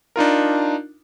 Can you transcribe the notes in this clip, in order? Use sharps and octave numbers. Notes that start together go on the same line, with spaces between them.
D4 D#4 F4 A#4